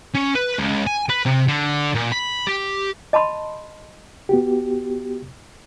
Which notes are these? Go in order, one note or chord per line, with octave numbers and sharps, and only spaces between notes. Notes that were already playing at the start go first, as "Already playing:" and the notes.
C#4
B4
C#2
G#5
B4
C3
D3
A#2
B5
G4
D#5 A5 B5 C6
B3 F#4 G4